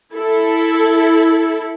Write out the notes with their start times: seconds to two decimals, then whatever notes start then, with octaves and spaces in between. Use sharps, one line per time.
0.14 E4 A4